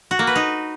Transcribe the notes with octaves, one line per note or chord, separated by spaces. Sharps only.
F#4
A#3
B4
D#4